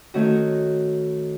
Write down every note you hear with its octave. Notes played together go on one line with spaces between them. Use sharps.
D#3 A3 C#4 F#4